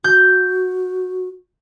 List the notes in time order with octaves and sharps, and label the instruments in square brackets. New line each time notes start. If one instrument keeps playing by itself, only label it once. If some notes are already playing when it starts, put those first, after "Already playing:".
[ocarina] F#4 [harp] G6